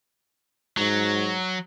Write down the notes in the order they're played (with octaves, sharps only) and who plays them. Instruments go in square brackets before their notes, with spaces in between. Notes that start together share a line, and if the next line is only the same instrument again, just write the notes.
[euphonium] G#2 [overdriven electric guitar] F#3